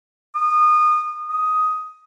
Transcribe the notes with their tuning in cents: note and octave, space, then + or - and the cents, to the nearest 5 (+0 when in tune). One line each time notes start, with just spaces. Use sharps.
D#6 -25
D#6 +10